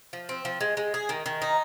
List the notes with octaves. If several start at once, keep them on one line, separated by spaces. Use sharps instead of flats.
F3
C4
F3
G#3
G#3
G#4
D#3
D#3
D#4